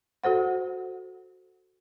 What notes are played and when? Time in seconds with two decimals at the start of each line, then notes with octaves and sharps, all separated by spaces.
0.24 F#4 A4 C5 F#5